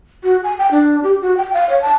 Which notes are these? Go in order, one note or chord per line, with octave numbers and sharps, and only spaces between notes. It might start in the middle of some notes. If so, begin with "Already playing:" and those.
F#4
G#5
G5
D4
G4
F#4
G5
F5
C#5
A5